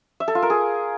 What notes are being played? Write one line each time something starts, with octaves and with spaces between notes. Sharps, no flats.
E5
A4
F4
A#4
G#4